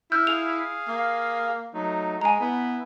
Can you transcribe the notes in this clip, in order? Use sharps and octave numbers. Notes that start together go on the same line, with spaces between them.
E4 E6 F6 G6
G#4 F5 F7
A#3
F#3 A3 D#4
G#3 G#5 A#5
B3 E4